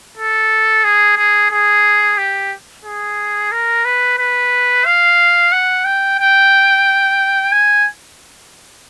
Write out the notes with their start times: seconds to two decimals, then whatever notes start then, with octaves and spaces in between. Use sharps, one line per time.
0.17 A4
0.84 G#4
1.18 G#4
1.51 G#4
2.18 G4
2.85 G#4
3.52 A#4
3.85 B4
4.18 B4
4.85 F5
5.52 F#5
5.85 G5
6.19 G5
7.52 G#5